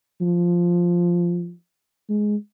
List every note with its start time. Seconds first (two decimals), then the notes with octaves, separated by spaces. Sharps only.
0.21 F3
2.09 G#3